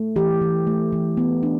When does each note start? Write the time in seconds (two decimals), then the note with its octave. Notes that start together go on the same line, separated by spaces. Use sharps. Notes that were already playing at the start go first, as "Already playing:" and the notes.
Already playing: A3
0.16 E3 G4
0.41 E3
0.67 A3
0.92 E3
1.17 B3
1.43 D4